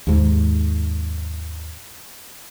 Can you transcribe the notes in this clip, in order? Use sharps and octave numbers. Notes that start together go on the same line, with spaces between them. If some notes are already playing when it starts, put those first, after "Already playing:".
D#2 G#2